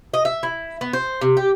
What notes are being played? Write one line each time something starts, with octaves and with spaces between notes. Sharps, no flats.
D#5
E5
E4
B3
C5
C3
G4